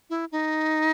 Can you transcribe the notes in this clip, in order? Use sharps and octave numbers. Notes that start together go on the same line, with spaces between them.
E4
D#4